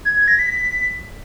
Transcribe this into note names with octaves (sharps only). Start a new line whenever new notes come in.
G#6
G#6
A#6
B6